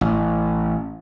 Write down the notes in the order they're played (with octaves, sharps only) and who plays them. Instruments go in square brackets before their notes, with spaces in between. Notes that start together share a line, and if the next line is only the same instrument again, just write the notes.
[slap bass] A1